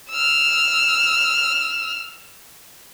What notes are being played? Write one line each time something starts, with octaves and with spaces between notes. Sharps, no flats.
E6 F6